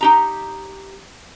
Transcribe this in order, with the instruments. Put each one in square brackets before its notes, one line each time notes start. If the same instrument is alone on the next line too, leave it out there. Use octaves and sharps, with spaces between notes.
[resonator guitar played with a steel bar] D#4 G4 A#5